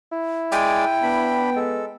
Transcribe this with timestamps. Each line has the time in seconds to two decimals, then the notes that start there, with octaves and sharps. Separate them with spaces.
0.12 E4
0.52 G#3 D5 G5 G#5
1.03 B3 D4 B5
1.56 G#3 A4